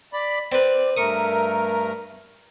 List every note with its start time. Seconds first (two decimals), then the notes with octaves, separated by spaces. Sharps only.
0.13 D5 B5
0.52 C4 B4 D5
0.97 G2 A3 A#4 C#6 D#6